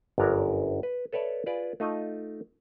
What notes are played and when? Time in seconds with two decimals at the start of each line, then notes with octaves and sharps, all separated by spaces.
0.18 G1 F#2 D4 A#4 C#5
0.83 B4
1.13 A4 B4 C#5 D5 E5
1.46 F4 G#4 B4 D5
1.80 A3 D#4 F4 D#5